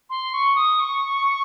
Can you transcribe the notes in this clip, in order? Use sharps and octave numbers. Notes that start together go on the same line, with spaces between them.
C6
C#6
D#6
C#6